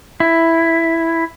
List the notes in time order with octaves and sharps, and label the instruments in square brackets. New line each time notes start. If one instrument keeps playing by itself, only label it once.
[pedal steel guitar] E4